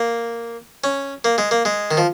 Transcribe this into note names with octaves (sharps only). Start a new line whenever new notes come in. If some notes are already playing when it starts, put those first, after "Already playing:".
Already playing: A#3
C#4
A#3
G#3
A#3
G#3
D#3
F3